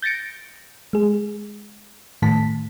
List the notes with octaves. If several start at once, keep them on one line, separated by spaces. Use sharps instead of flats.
G6 A6 A#6 C#7 D7
G#3 G#4
A2 D#3 A3 A5 B6